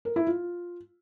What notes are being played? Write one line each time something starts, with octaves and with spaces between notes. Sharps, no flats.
A#4
E4
F4